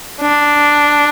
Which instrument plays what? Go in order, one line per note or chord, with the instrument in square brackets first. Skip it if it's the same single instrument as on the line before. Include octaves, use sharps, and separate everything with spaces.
[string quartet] D4